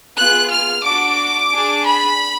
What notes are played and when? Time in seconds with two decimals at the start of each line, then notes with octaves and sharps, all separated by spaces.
0.17 B3 F4 G#4 F#6
0.50 F6
0.84 D4 F#4 D6
1.51 D4 G#4
1.85 B5